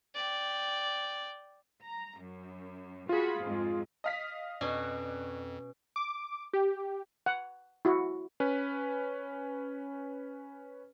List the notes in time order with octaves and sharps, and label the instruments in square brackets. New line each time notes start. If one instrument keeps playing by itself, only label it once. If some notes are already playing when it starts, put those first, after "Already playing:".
[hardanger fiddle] D5 G5
[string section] A#5
F#2
[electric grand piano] F4 G#4 [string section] F#4 B5
[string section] F2 G#2
[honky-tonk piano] D#5 F5 B6
[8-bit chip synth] F2 [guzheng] B2 C#4 F#4 [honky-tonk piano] D4
[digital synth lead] D6
G4
[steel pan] F#5
E4 F#4
[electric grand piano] C#4 B4